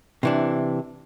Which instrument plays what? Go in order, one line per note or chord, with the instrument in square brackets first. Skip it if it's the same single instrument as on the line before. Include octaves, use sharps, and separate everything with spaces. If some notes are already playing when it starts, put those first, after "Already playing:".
[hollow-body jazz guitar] C3 E3 D4